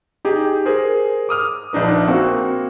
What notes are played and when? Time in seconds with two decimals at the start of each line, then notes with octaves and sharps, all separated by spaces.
0.25 D#4 G4 G#4
0.66 G#4 A#4 C5
1.29 D6 D#6 F6
1.73 A#1 D4 D#4 B4
2.08 A#3 C4 F#4 F#5